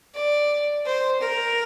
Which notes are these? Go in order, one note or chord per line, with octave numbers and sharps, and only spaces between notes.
D5
C5
A#4